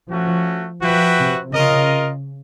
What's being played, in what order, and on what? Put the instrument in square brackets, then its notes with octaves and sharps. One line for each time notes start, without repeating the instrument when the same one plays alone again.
[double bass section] F3 [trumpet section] A3 C#4 F#4
[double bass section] F3 [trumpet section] F#4 B4 E5 G5
[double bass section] C3
[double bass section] C#3 [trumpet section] F4 A#4 D#5